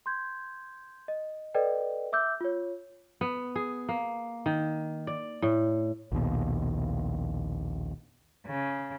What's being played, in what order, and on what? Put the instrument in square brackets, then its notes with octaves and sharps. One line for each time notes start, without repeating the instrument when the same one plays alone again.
[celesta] C6 G6 G#6
D#5
A4 B4 D5 D#5 G5
E5 D6 E6 G6
F4 C#5
[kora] B3
G#4
A#3
D#3
D5
A2
[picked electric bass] A#1 D#2 B2
[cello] C#3